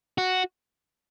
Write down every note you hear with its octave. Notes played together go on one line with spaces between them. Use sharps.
F#4